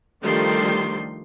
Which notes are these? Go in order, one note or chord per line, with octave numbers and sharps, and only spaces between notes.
D#3 F3 G3 A3 D4 C6